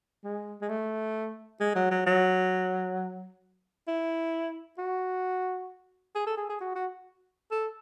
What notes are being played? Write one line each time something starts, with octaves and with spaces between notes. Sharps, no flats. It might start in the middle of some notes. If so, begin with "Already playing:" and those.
G#3
G#3
A3
G#3
F#3
F#3
F#3
E4
F#4
G#4
A4
G#4
G#4
F#4
F#4
A4